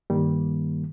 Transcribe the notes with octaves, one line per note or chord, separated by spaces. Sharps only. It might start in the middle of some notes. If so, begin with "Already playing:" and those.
G2 D#3 G3 A#3